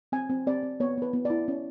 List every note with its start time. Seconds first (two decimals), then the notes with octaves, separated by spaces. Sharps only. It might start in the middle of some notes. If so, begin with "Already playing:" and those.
0.12 C4 G#5
0.30 C4
0.47 C4 D5
0.63 C4
0.80 B3 C#5
0.98 B3 B4
1.13 B3
1.25 E4 D5
1.48 C#4